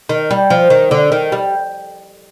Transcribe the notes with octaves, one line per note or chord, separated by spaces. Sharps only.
D#3
G3
F3
D#3
D3
D#3
G3